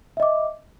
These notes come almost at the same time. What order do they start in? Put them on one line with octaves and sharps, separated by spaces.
E5 D#5 D6